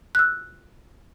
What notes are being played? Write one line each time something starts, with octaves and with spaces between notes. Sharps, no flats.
E6 F#6